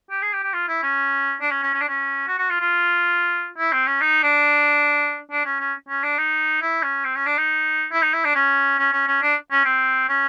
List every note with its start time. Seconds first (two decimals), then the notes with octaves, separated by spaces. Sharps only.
0.10 G4
0.22 G#4
0.33 G4
0.43 G4
0.54 F4
0.68 E4
0.83 C#4
1.41 D4
1.51 C#4
1.63 C#4
1.73 C#4
1.81 D4
1.88 C#4
2.27 F#4
2.38 F#4
2.50 F4
2.60 F4
3.58 E4
3.72 C4
3.87 C#4
4.01 D#4
4.23 D4
5.31 D4
5.45 C#4
5.60 C#4
5.89 C#4
6.04 D4
6.18 D#4
6.62 E4
6.83 C#4
7.05 C4
7.16 C#4
7.27 D4
7.38 D#4
7.92 E4
8.02 D#4
8.13 E4
8.25 D4
8.35 C#4
8.78 C#4
8.93 C#4
9.07 C#4
9.22 D4
9.51 C#4
9.65 C4
10.09 C#4